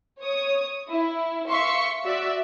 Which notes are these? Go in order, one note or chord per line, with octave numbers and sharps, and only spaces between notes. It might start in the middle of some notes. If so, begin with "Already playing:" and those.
C#5 D#6
E4
E5 F5 C6 C#6 B6 C#7
F#4 D5 E5